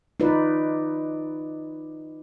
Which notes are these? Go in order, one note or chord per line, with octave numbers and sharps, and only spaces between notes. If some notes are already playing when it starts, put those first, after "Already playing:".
D#4 F4 B4 D5